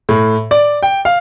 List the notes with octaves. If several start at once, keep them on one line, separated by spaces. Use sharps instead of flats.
A2
D5
G5
F5